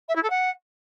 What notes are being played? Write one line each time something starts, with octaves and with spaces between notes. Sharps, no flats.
E5
E4
A4
F#5